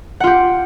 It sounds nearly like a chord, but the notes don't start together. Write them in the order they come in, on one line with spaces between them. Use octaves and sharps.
F#5 F4 G4